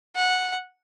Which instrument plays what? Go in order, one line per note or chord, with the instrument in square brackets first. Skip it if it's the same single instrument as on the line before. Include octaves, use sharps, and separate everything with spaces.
[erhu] F#5